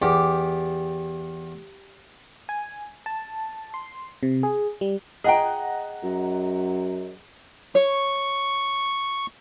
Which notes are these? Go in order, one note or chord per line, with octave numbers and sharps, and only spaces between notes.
E2 G4
G#5
A5
C6
C3
G#4
G3
G#4 D#5 F#5 G5 A#5
F#2
C#5 C#6